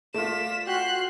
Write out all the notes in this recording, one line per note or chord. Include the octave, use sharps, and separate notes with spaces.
A3 F4 D5 B6 E7
F#4 G5 C6 F#6